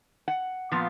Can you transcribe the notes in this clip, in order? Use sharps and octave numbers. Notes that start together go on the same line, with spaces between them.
F#5
A#2 F3 B3 F4